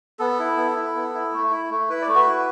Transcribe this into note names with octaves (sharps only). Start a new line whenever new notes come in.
B3 A4
E4
B3
E4
B3
E4
A3
E4
A3
E4 B4
D5
A3
F#4 B4
E4